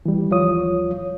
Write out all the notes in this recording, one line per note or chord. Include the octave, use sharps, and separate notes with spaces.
E3 G3
D#2 F3 F4 C#5 D#6